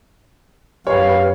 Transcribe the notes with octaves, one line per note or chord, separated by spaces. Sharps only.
F#2 G4 B4 C#5 F5